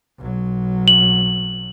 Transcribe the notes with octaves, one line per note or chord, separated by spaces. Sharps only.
B1 F#3
F#7